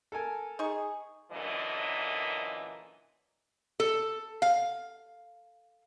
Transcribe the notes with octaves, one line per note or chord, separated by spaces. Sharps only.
A4 A#4 G#5
D#4 G#4 C#6
F#2 A#2 D3 E3 F#3 D#5
A4
F5